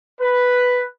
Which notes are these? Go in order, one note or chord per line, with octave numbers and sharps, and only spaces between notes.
B4